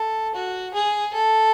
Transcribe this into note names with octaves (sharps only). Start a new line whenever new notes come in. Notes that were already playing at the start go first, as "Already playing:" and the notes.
Already playing: A4
F#4
G#4
A4